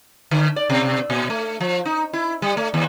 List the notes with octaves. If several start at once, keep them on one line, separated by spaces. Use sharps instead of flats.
D3
D5
B2
A#2
A3
F3
D#4
E4
G3
A3
D#2